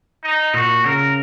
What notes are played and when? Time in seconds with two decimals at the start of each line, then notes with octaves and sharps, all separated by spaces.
0.23 D#4
0.54 A#2 F#4
0.85 C#3 A#4